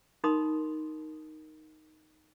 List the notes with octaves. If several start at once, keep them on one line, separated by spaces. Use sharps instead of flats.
D#4 A#4 B5 C6 D#6